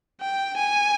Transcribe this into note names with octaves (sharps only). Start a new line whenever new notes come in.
G5
G#5